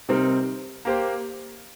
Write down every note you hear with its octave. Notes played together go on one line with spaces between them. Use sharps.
C3 G3 C4 D#4 A#4
A#3 G4 C5